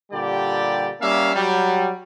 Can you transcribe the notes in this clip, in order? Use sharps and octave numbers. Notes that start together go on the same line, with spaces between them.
A#2 D3 G3 G4 D5
G3 A#3 C#4 E5 F5
F#3 G3